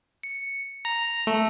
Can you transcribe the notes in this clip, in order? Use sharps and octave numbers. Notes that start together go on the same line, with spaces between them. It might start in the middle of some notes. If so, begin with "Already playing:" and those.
C#7
A#5
A3